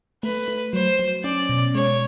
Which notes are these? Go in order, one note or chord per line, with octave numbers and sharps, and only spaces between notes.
A3 B4
A3
F#3 C5
F#3
C#4 D5
B2
G#3 C#5